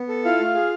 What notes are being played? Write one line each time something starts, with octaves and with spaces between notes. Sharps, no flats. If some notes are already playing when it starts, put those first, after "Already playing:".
Already playing: B3
A4
E4 F4 F5
A3
G#4